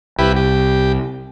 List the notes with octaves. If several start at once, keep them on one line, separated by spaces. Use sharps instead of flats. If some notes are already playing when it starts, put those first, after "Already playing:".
C2 E4 G4 B4
G4